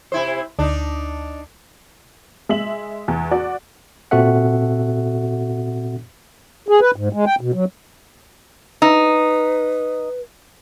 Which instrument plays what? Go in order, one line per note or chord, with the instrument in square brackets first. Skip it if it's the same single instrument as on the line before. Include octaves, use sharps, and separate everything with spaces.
[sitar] C3 E4 C5
[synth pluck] D2 [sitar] D4 D#4
[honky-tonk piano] G#3 E5 F#7
E2
F#4 D5
[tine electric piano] A#2 C4 F#4 A4 E5 F#5
[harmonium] G#4
B4
G#2
G#3
G5
B2
F#3
[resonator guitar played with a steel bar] D#4 [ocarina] B4